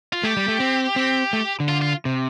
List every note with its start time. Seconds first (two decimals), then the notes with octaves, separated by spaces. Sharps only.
0.13 F4
0.23 A3 G4
0.37 G3
0.48 A3
0.60 C4
0.96 C4
1.33 A3
1.60 D3
1.68 F4
1.81 F4
2.05 C3